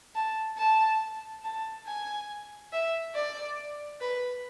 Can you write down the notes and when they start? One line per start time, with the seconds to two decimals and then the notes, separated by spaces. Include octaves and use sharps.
0.15 A5
0.58 A5
1.44 A5
1.87 G#5
2.72 E5
3.15 D5
4.01 B4